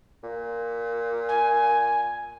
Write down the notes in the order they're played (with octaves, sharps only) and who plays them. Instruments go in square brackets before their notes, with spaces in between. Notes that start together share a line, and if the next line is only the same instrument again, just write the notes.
[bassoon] A#2
[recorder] G#5